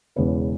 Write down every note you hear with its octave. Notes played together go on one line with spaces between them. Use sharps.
E1 E2 C#3 B4